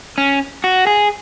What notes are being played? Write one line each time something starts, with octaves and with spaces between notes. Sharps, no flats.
C#4
F#4
G#4